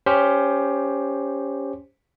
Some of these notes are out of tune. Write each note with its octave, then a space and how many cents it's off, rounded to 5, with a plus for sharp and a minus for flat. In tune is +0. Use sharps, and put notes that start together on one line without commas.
C#4 +15 G4 +10 C5 +0